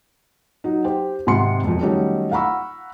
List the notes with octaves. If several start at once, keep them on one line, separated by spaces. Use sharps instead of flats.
F#3 D#4
G4 C5 G5
G#1 G#2 C3 F#5 C6 C#7
E1 F2
D#3 F#3 G3 A3 C#4 D#4
F5 F#5 A#5 B5 C#6 E6